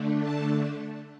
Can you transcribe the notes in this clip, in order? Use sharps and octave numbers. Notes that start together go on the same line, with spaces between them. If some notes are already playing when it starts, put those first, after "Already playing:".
Already playing: D3 A3 D4
A5